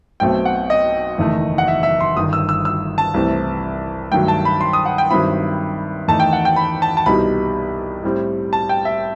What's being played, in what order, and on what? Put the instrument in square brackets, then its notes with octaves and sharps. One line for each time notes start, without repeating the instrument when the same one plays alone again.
[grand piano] B1 B2 A3 C4 G5
F#5
D#5
F#1 E2 D#3 A3
F#5
E5
E5
C6
G1 G2 D#3 D#6
E6
E6
E6
A5
C2 C3 E3 A3 C4
G2 D#3 F#3 A3 G5
A5
B5
C6
D#6
F#5
G5
G2 D#3 F#3 C4 E4 B5
E2 D#3 A3 D#4 A5
G5
F#5
G5
B5
A5
A5
C2 B2 G3 D#4 B5
A2 G3 C4
A5
G5
E5